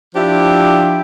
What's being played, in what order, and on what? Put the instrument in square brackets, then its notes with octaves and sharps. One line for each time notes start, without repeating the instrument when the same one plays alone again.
[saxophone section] F3 D4 E4 G4 C5 E5